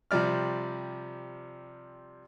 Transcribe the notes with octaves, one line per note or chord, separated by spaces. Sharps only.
C3 F3 G3 D5 F6